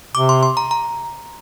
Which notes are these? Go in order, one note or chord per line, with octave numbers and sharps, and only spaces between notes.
C3 D6
C6
C6
A#5
A#5